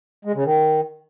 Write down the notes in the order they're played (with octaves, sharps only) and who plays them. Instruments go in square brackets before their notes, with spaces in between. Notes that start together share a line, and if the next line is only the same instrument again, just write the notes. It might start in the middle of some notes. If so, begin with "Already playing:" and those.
[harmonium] G#3
C#3
D#3